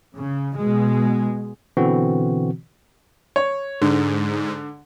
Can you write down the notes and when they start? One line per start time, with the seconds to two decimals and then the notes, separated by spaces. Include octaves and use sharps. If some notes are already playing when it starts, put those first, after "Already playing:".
0.15 C#3
0.55 B2 G#3
1.77 B2 D3 E3 C4 F#4
3.36 C#5
3.82 G#2 D3